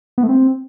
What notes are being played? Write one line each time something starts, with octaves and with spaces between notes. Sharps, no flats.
B3
A3
C4